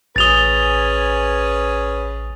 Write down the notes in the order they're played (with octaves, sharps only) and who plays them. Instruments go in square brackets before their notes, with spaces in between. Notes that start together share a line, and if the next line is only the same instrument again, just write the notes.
[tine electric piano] A1 D#6 [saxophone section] C#4 G#4 B4 [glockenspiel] A6 F7 G7